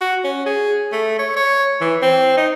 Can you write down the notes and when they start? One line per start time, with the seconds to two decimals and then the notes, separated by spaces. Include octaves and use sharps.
0.01 F#4
0.24 C#4
0.46 G#4
0.92 A3
1.19 C#5
1.37 C#5
1.81 E3
2.02 C4
2.37 D#4